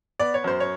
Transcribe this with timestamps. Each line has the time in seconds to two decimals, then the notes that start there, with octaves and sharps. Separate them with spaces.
0.20 B3 D5
0.34 C#5
0.44 F#2 C5
0.60 C#5